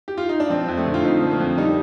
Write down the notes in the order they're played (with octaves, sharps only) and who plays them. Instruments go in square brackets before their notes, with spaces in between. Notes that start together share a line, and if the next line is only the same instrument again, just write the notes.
[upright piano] G4
F4
D#4
D4
[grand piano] F3 [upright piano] C4
[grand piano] F2
[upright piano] A3
[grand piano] D3
[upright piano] F4
[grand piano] F2 [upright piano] D#4
[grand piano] F3
[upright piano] A#3
[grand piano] F2
[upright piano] G3 [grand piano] D#4